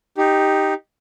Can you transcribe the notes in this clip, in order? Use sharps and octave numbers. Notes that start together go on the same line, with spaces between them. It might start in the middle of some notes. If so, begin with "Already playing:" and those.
D#4 G4